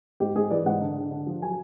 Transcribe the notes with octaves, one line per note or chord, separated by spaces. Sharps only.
G#2 G4
G#2 G#4
E3 D5
G#2 F#5
D3
D3
D3
F3
F#3 G#5